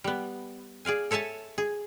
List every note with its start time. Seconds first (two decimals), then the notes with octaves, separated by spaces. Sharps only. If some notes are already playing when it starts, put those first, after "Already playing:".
0.04 G3 B3
0.85 G#4 D5 F5 G#5
1.11 A4 C#5 E5 G#5 A5
1.58 G#4